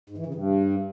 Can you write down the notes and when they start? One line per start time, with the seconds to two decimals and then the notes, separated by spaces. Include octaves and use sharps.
0.10 G#2
0.18 E3
0.26 C#3
0.34 G2